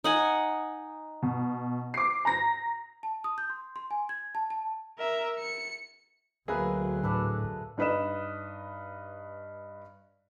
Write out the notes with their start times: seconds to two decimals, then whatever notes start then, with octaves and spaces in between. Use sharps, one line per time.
0.04 D#4 F#5 G#5
1.22 B2
1.94 D6 C7
2.25 A#5 A#6
3.03 A5
3.24 D#6
3.38 G6
3.50 C6
3.76 C6
3.91 G#5
4.09 G#6
4.35 A5
4.50 A5
4.98 A#4 E5
5.39 C#7
6.48 D2 F#3 G#3 A#3 G#4 B4 E5
7.04 A2 D4 A4 B4
7.77 G2 D#4 B4 D#5 E7